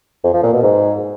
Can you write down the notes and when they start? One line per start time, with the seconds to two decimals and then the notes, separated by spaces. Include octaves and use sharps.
0.24 F2
0.34 F3
0.43 A#2
0.53 B2
0.63 G#2